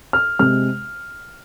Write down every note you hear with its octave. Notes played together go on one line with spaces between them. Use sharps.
F6
C3 G#3 F6